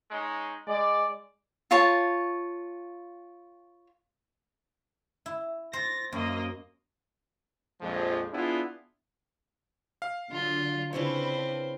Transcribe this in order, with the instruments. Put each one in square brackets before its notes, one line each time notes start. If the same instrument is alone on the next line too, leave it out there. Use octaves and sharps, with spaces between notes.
[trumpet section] G#3 C#4 D#4
[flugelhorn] G#3 [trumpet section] D5
[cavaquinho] F4 C#5 A5
[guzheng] E4
[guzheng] C5 [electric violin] A6 A#6
[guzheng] F#2 [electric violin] A#3 D#5
[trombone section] A#1 F2 F3 G#3
B3 D4 E4 F4 G#4
[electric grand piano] F5
[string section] D3 F#3 [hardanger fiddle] F4
[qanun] C#3 E4 C#5 [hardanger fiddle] C4 [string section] D4 B4